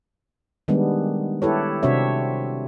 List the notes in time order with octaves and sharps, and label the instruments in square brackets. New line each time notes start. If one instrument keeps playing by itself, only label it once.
[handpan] D#3 G3 G#3 B3 D4
E4 G4 A4 B4 C#5
C3 C4 D4 F#4 C#5 E5